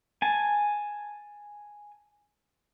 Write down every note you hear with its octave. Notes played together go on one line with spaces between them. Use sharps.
G#5 A5